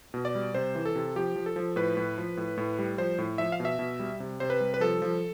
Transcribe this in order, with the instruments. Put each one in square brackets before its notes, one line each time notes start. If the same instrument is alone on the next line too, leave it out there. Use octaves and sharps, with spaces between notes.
[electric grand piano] B2
D5
G3
C3 C5
E3
A4
C3
F3 G4
F3
A4
F3
A2 B4
A2
F3
A2
A2
G3
F3 C5
A2
F3 E5
F5
B2
E5
B2
G3
C3
C3 C5
B4
G3
B4
F3 A4
F3